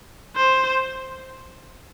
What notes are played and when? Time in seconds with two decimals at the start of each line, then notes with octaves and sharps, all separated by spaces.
0.36 C5